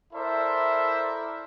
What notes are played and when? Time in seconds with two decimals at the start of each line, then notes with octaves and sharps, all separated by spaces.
0.13 E4 A4 A#4 C5 D5 E5